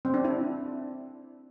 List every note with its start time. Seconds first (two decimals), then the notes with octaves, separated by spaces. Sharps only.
0.05 C4
0.14 D4
0.25 E4